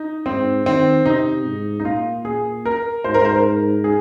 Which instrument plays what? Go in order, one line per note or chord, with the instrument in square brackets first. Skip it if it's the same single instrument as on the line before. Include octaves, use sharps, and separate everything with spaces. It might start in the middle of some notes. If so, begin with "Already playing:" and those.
Already playing: [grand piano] D#4
[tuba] G#2 [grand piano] C4
[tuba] D#3 [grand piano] C4
[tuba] C3 [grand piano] D#4
[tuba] G#2
[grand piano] D#4
[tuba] A#2 [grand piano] F4
[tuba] A#2 [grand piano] G#4
[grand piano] A#4
[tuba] G#2 [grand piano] C5
[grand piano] A#4
C5
A#4
G#4